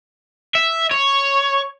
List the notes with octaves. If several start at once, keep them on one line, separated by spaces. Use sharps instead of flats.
E5
C#5